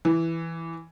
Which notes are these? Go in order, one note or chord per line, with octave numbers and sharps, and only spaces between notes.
E3